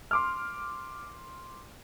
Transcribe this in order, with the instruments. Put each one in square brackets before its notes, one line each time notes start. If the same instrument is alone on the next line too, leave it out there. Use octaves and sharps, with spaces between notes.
[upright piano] C6 D6 F6